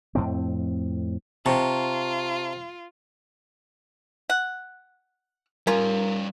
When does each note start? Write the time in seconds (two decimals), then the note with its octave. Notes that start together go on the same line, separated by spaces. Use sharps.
0.15 F2 A2 C4
1.46 C3 F4 A5 A#5 C#6
4.30 F#5
5.67 G3 C#4 F4 A#4 F5